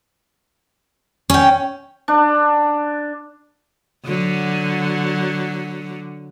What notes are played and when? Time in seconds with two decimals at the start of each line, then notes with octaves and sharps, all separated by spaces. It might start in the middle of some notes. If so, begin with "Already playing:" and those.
1.30 C#4 C#5 G5
2.08 D4
4.06 D3 F#3